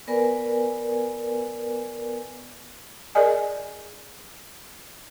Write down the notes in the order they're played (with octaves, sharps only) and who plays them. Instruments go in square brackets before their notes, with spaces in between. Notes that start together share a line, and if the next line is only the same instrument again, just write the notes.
[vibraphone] B3 A#4 B4 D5 G#5
[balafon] G#4 A#4 D5 D#5 G#5